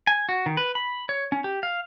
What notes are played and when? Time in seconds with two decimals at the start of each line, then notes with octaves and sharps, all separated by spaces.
0.07 G#5
0.29 F#4
0.46 D#3
0.57 B4
0.75 B5
1.09 C#5
1.32 C#4
1.44 G4
1.63 F5